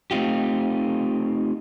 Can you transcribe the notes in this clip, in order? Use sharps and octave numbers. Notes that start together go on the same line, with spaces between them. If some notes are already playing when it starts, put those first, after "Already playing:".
A3 C4 D#4 F4 G4